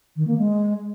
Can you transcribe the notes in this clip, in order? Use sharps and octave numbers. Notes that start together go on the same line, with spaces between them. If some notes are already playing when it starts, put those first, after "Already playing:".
D#3
A#3
G#3